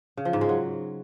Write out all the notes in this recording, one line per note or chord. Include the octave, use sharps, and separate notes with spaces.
C#3
F3
G#2
G#3
F#3